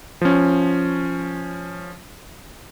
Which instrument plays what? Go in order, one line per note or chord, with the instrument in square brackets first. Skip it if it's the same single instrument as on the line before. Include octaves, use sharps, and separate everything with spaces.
[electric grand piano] F3 C#4